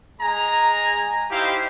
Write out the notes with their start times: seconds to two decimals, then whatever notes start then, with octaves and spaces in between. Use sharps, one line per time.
0.20 G#3 G#5 A#5
1.31 D#4 E4 G4 C5 F5